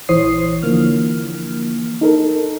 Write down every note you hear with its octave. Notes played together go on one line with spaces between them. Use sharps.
A#1 E3 C5 C#5 D#6 C7
D3 E3 F3 A#3 F6
D#4 A4 A#4